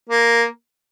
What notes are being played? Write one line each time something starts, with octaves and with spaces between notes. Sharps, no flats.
A#3